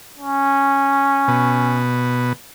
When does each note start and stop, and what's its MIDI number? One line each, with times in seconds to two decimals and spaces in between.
0.18 1.82 61
1.28 2.33 47